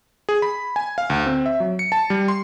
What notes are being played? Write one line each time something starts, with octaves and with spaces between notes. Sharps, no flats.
G#4
B5
G#5
F5
D2
C4
E5
F#3
C#7
A5
G3
C6